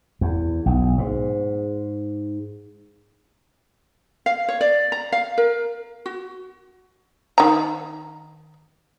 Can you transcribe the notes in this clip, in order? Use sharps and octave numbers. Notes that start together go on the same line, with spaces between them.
E2
B1
G#2
F5
C#5
D5
A#5
F5
A#4
F#4
D#3 A#5